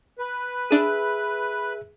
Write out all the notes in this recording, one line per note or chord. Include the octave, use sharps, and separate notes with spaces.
B4
D4 G#4 E5 D#7